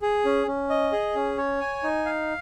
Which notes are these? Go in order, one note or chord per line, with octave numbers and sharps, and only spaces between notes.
G#4
C#4
C#4
D#5
G#4
C#4
C#5
G#5
D#4
F5